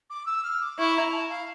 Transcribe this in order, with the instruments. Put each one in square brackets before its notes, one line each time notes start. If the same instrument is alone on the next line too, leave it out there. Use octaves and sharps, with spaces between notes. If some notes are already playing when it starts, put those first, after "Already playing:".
[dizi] D6
E6
F6
D6
[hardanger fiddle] E4 [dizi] C#6
[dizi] A#5
A5
F5